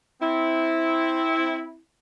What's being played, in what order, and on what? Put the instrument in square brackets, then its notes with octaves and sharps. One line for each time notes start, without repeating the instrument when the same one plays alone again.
[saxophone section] C4 E4